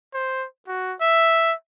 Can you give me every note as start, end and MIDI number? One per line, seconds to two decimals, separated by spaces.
0.14 0.46 72
0.67 0.94 66
1.00 1.53 76